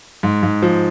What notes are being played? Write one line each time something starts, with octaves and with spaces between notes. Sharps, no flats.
G#2
G#2
F3